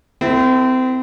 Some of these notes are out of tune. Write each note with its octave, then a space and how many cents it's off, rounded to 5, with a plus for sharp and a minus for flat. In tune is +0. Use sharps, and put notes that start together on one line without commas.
C4 -30 E4 +0 A4 +25